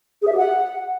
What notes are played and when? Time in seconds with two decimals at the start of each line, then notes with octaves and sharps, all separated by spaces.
0.22 G#4
0.27 E5
0.32 G4
0.37 F#5